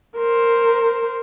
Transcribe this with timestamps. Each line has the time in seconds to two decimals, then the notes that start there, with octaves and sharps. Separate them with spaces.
0.17 A#4 C5